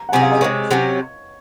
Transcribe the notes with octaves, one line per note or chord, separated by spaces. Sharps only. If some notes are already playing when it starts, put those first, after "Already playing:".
Already playing: A#5
F#5
C3 F#3 C#4 G#4 G#5
F5
D#5
C3 D#3 G#3 C#5
C3 F#3 C#4